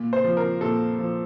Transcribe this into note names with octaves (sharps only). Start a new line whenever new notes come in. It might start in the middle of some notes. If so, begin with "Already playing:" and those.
Already playing: A#2
C5
F3
A#4
A#2 A4
F3